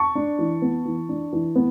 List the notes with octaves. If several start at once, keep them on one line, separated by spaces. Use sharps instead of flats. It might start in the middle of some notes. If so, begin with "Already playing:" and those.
Already playing: A5 C#6
D4
E3
B3
E3
D4
E3
B3